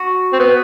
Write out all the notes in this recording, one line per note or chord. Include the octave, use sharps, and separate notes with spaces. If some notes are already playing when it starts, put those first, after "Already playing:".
Already playing: F#4
C4
B3